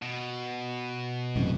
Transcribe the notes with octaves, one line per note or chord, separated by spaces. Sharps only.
B2
A1 F#2 C3